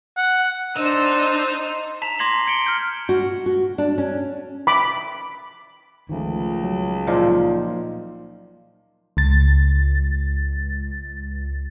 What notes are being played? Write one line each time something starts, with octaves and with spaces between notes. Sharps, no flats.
F#5
D4 D#4 C5 D#5 E6
A5 A#5 B6 E7 F7
C6 D6 G#6 A#6 C7 F#7
G#6 C#7 D7 G7
F6 G6 C#7
F#4
F#4
D4
C#4
B5 D6
C#2 D#3 F3 A3
F#3
A#2 F3 D#4
C#2 A6